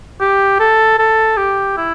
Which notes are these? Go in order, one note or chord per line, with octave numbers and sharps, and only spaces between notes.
G4
A4
A4
G4
E4